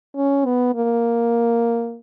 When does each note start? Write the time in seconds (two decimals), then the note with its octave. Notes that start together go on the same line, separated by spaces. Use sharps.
0.16 C#4
0.46 B3
0.75 A#3